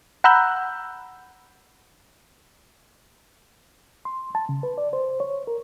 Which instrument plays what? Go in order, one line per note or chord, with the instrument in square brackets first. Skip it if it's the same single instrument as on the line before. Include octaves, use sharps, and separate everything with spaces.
[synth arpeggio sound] F#5 A#5 B5 E6 F#6 G6
[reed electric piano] C6
A5
C#3
B4
D5
C5
C#5
A#4